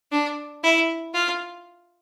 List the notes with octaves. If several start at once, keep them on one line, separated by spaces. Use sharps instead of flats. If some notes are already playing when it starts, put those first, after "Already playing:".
D4
E4
F4